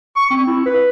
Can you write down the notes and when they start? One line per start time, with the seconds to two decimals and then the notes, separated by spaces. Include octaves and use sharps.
0.16 C#6
0.31 C4
0.47 E4
0.66 B4